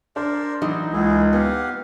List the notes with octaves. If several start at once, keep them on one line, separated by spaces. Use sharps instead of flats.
D4 A#4 C5 D5
E3 F#3 D#4 E4
C#2 A#3 E4 G#4
B3 G4 F5 F#5